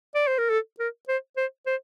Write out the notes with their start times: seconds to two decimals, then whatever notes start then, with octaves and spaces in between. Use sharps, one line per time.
0.15 D5
0.27 C5
0.38 A#4
0.50 A4
0.79 A#4
1.08 C5
1.37 C5
1.66 C5